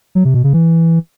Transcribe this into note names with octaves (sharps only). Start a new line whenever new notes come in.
F#3
C3
B2
C#3
E3